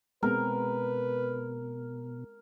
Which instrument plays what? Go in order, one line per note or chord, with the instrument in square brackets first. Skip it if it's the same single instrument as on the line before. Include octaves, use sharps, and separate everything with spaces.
[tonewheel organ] B2 [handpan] G#3 B3 C4 [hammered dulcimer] A#4 [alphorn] B4